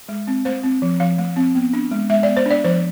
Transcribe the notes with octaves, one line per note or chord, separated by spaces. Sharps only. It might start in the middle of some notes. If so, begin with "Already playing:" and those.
G#3
C4
A3 C5
C4
F3
F3 F5
A3
C4
B3
D4
G#3
G#3 E5
B3 D5
C5
D4 D5
F3 C5